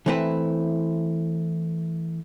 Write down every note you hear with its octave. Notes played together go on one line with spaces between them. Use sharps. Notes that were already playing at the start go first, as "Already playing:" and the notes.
E3 A3 C4 E4 B4